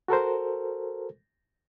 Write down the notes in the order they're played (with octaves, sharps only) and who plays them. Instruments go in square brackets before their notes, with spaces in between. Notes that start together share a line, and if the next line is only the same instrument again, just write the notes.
[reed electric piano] F#4 A4 A#4 C5